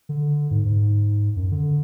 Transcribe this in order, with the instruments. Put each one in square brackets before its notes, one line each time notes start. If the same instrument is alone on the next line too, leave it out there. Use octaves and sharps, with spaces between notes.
[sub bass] D3
G#2
G#2
F#2
D3